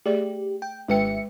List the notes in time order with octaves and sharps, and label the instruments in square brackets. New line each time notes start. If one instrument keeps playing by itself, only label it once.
[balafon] A3 G#4 D5 [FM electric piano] G4
[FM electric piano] G5
[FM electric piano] G#1 E5 C#7 [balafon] G#3 B4 G5